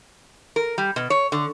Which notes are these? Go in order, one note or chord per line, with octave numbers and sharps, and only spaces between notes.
A#4
G3
B2
C#5
D3